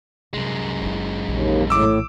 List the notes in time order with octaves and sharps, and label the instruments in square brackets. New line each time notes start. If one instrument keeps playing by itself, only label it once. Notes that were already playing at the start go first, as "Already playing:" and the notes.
[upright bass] C2 [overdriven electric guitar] F#2 G#3
[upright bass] F#1 E4
[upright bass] A#1 E3 [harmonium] D#2
[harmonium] A2 [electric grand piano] D6 E6